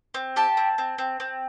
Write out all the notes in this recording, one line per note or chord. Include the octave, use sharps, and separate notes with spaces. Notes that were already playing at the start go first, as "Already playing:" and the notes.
C4
G4 A5
C4
C4
C4
C4